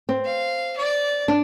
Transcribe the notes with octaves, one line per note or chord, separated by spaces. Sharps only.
C4
F5
D5
D4